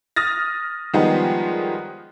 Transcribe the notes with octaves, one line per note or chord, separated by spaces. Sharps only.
D#6 F6 A6 A#6
D#3 F3 G3 G#3 B3 D#4